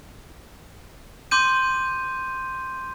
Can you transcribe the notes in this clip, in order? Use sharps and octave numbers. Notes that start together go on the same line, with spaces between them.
C6 D6 G6 D#7